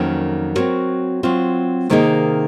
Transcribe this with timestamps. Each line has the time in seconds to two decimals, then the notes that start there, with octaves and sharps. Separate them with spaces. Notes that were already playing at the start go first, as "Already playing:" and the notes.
Already playing: F2 D#3 F#3 A#3 C#4
0.55 F#3 C4 F#4 A#4 C#5
1.23 F#3 C4 F4
1.90 C3 D#3 A#3 D#4 G#4